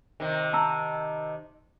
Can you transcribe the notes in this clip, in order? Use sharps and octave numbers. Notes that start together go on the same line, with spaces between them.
C3 D#3
A5 A#5 E6